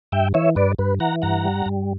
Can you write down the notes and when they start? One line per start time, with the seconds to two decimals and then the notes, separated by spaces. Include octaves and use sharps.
0.12 G2 E5 G5
0.34 E3 C#5 E5
0.56 G2 B4 D5
0.79 G2 B4
1.00 E3 F#5 A#5
1.22 G2 F#5 A#5
1.45 G3
1.66 G2